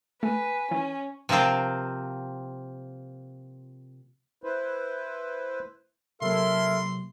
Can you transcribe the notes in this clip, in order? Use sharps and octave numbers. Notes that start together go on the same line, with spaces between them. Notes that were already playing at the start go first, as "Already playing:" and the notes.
A3 B4 G#5
E3 C#4
C3 F3 A#3 C4 F4
E4 B4 C5
C3 F#3 A#3 E4 A4 A#4 E5 C6